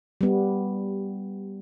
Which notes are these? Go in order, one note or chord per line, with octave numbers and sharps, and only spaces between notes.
G3 B3